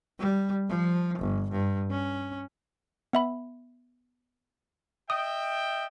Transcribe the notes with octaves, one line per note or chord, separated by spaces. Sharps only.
G3
F3
G1
G2
C#4
B3 E5 B5
D#5 E5 G5 D#6